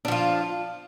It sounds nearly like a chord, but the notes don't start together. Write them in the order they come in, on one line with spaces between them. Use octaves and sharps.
D4 F3 F4